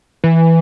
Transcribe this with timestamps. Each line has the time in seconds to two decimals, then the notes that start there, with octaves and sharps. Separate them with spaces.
0.24 E3